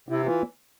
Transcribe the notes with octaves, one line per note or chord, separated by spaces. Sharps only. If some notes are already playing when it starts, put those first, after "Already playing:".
C3 E4
E3 F4